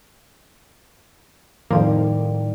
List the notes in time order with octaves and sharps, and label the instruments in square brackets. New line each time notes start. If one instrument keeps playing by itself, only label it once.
[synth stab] F2 F3 A#3 [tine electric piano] A2 [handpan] D#3 [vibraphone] G3 D5